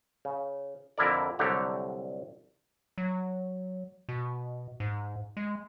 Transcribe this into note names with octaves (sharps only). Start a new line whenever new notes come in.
C#3
F2 D3 E4 A#4 D5
C2 D3 F#3 G4 A4 A#5
F#3
B2
G#2
G#3